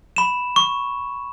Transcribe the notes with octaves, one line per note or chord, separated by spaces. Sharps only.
B5 E7
C#6